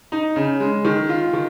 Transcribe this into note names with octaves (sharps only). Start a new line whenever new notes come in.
D#4
C#3
G#3
D#3
F4
D#3